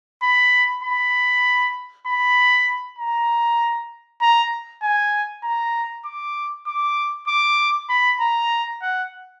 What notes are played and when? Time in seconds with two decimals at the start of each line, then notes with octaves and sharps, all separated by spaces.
0.23 B5
0.83 B5
2.07 B5
2.99 A#5
4.21 A#5
4.83 G#5
5.43 A#5
6.05 D6
6.67 D6
7.28 D6
7.89 B5
8.21 A#5
8.82 F#5